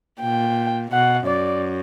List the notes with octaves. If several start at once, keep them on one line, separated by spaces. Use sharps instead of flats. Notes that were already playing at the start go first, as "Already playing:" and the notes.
A#2 G5
B2 F#5
F#2 D5